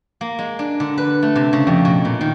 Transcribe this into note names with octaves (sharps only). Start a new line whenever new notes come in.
A#3
G#3
D4
D3
B4
A3
C3
C#3
F2
B2
A#2
D#3